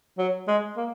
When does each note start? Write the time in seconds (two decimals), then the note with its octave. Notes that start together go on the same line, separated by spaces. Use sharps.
0.18 F#3
0.48 G#3
0.77 A#3